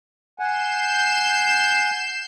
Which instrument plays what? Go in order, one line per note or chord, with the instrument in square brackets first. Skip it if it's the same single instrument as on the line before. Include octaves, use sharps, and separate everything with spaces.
[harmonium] F#5 G#5 [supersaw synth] G6 C7 E7